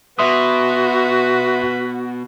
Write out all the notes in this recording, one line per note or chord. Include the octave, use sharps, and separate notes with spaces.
B2 F#4 B4 E5 C6 D#6